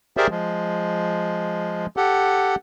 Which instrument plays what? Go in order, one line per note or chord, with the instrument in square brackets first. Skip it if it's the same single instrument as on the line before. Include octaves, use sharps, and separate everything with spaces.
[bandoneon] G4 G#4 A#4 C5 D5 E5
F3 G#3
G4 A4 F#5